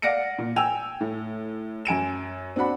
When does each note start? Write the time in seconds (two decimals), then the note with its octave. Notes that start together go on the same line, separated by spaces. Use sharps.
0.02 D5 F5 F#5 A#6 C#7 D7
0.38 A#2
0.56 G5 G#5 E6 F7
1.01 A2
1.85 F#2 G#5 D7 E7
2.56 C4 D4 F#4 F#5 B5